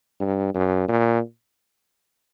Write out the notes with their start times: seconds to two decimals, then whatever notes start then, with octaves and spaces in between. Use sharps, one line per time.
0.20 G2
0.54 F#2
0.88 A#2